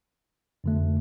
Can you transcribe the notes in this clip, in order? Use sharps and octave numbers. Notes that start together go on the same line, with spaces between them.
F2 D3 A3